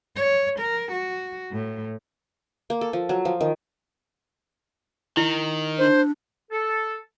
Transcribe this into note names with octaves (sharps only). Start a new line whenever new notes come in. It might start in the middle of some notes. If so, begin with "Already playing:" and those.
C#5
A#4
F#4
A2
A#3
A4
F3
F#3
F3
D#3
D#3 E4
D4 C5
A4